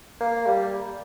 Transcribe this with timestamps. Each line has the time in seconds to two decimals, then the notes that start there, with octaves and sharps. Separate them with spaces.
0.21 A#3
0.46 G3